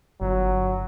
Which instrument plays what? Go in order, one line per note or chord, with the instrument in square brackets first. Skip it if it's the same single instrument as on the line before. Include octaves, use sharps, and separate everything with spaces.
[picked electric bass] G1 [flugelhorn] F#3